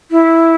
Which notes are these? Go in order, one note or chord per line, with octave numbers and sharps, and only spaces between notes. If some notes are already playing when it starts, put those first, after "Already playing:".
E4